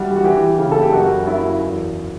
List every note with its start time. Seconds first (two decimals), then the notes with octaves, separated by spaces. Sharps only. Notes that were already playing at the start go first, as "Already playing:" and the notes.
Already playing: E3 G3 F#4
0.16 F#4
0.24 E3 G4
0.58 C#3
0.72 A4
0.82 G4
0.93 F#2 F#4
1.26 F#2 E4
1.60 E2